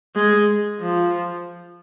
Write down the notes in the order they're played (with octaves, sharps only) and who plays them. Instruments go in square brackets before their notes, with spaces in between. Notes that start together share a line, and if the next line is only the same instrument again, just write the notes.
[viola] G#3
F3